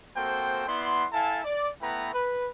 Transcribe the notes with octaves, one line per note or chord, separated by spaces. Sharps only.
A#3 C4 F#4 A4 C5 G5
B3 E4 D5 F#5 C6
E4 A4 F5 G#5 A5
D5
A3 B3 E4 B4 G5 A#5
B4